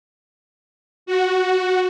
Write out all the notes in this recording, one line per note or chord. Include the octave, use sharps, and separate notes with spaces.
F#4